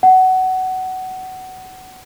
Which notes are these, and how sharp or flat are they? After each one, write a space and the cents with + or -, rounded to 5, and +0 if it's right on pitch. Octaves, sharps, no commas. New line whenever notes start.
F#5 +15